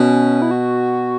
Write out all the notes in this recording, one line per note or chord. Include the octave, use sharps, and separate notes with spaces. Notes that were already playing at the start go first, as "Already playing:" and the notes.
Already playing: B2 C#4
E4
F#4